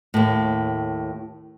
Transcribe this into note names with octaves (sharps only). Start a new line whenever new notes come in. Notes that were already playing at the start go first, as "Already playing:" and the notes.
D#2 A2